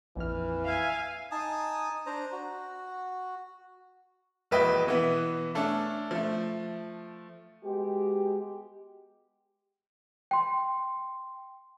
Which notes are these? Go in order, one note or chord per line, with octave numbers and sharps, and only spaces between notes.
A#1 F2 E3 F6
E5 F5 G#5
D#4 G#5 A5 D#6
D4 C5 A#5
F#4
E1 A#1 E4 B4 D#5 G5
B2 E3 B3
A3 C#4 D4 A4
F3 A3
G#3 B3 F#4 G4
G5 C6